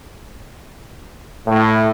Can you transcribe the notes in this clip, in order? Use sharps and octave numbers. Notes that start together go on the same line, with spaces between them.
A2